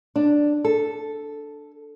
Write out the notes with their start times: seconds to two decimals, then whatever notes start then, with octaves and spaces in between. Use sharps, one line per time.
0.16 D4
0.65 A4